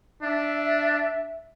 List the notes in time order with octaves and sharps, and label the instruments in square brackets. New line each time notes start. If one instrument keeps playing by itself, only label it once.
[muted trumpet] D4 [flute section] E5